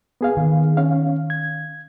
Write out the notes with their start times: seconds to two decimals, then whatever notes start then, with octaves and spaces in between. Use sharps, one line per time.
0.21 B3 G#4 F5
0.37 D#3
0.77 C#4 F5
1.30 G#6